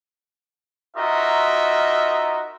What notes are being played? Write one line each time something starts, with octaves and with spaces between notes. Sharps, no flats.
D#4 F4 F#4 A#4 D#5 E5